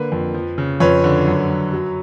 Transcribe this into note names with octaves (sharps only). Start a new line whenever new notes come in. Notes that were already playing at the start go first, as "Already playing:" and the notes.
Already playing: D3 A#3 B4
F2
F3
C#3
F2 B4 C#5
D3
F#2
F#2
F#3